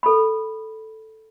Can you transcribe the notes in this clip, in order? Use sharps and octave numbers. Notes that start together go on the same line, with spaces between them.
A4 B5